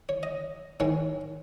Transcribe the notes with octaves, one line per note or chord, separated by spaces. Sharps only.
C#5
D#5
G#2 D#3 G#3 C#5